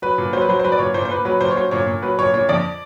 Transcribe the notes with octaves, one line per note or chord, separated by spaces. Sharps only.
F#3 B4
A#2
F#3 C5
B4
F#3 C5
C5
F#3 B4
D5
A#2 C#5
A#2 C5
C5
A#2 B4
F#3 B4
A#2 C5
C#5
F#3 C5
A#2 C#5
A#2
F#3 B4
A#2 C#5
A#2 C#5
F2 D5